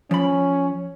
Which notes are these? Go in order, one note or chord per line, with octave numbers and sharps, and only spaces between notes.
F3 C#4 B5